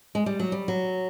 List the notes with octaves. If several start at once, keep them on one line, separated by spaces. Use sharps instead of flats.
G#3
G3
F#3
G3
F#3